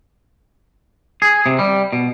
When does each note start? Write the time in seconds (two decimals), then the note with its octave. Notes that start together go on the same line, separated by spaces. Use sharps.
1.22 G#4
1.46 C3
1.59 G3
1.93 B2